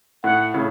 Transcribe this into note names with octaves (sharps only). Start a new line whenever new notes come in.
A2 F#5
A2 C#3